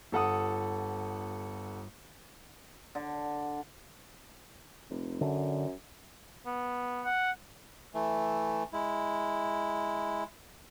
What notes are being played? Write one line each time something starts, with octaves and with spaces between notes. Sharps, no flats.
G1 A4 F#5 D#6
D3
F1
F#2 D3
B3
F#5
E3 A3
G#3 E4